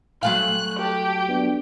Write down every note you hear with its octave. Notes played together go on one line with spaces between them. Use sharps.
F#3 A3 F5 G5 G#5 C6 F#6
G4 A4 A5
B3 D4